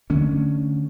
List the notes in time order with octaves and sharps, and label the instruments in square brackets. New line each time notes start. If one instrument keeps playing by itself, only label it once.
[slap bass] D3 A3 C#4